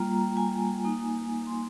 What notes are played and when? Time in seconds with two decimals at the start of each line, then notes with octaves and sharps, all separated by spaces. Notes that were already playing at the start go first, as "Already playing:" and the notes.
Already playing: G3 A#3 F4 A#5
0.37 G#5
0.84 A#3 D#4
1.47 C6